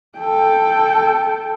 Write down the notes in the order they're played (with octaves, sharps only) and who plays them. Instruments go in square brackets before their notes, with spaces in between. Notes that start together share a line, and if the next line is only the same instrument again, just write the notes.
[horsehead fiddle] A4 G5